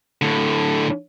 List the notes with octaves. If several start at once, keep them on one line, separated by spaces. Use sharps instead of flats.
A2 D3